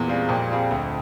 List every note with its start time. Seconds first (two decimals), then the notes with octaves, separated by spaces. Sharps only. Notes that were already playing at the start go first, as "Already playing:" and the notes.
Already playing: E2 A#2
0.08 G3 C4 F4 G#4
0.29 F2 A#2
0.50 G3 C4 F4 G#4
0.71 D2